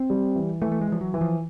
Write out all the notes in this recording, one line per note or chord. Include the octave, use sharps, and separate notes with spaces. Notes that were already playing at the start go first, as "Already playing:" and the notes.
Already playing: C4
G3
E3
E3 A3
A3
G#3
E3 F3
F#3
E3
F3